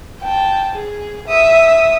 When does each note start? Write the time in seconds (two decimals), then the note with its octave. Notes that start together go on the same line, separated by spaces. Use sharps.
0.21 G5 A5
0.75 G#4
1.28 E5 D#6